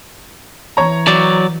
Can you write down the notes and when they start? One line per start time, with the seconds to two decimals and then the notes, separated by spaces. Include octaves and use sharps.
0.77 E3 C#5 A#5
1.07 F#3 D5